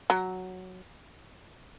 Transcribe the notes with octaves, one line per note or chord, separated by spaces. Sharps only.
F#3